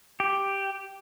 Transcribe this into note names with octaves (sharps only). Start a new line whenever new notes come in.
G4